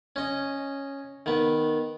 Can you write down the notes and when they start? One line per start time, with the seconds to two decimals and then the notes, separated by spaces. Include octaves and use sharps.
0.16 C#4 D#5
1.26 D#3 B3